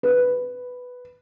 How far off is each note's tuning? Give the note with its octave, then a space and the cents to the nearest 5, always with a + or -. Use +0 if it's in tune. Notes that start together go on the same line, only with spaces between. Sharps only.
B4 +5